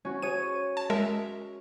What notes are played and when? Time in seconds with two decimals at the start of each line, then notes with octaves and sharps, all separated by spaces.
0.05 C#4 F#4
0.22 G#4 C#5 D#7
0.77 A5
0.90 G#3 A#4 E5